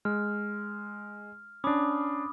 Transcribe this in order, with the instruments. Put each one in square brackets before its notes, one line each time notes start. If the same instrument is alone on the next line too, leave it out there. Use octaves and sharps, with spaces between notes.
[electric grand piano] G#3 [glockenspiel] F6
[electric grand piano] C#4 D4 [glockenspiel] B5 D6 D#6